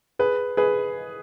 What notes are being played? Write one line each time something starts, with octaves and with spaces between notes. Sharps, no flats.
G#4 B4
G#4 B4